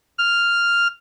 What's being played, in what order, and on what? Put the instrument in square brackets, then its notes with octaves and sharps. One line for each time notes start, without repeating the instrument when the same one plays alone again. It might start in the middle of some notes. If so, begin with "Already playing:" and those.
[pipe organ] F6